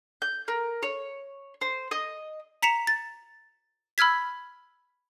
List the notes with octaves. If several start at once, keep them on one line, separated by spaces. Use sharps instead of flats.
G6
A#4
C#5
C5
D#5
A#5 B6 C#7 E7 F7
A6
B5 E6 F6 G#6 B6